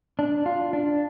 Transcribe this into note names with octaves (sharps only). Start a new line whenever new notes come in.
D4
F4
D4